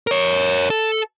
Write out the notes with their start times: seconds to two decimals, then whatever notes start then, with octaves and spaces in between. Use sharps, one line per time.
0.07 A#4 C#5
0.70 A4